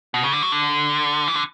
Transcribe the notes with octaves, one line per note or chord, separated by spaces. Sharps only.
B2
C#3
D3
F#3
D3
E3
D3